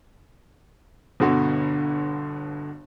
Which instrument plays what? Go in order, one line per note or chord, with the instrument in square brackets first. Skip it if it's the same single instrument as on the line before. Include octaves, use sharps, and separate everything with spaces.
[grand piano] G1 B2 D3 F#4